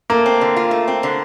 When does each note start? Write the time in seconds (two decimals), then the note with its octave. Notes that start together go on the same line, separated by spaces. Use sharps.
0.10 A3 A#3
0.26 C4
0.41 D3
0.56 F4
0.71 A3
0.88 C4
1.03 D3